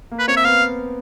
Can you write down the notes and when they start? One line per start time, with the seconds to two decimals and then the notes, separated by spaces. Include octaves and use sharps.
0.11 A#3
0.19 B4
0.28 C4 C#5
0.37 E5
0.44 B3 F5